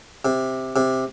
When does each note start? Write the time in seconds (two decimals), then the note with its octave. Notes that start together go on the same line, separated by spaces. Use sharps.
0.25 C3
0.76 C3